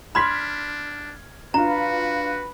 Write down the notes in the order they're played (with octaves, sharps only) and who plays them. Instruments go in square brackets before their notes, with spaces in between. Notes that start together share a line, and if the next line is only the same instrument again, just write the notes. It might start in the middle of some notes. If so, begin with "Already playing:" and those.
[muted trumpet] D4 [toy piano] B5 C6 [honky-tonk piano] F6 G#6 B6
[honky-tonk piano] D4 F4 [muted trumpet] F#4 [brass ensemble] B4 [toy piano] A#5